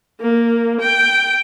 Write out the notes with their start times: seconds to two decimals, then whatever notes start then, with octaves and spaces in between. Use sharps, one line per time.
0.20 A#3
0.81 G5